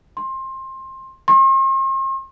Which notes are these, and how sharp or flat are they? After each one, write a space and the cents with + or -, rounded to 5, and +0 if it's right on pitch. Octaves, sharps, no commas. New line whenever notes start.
C6 +20
C6 +45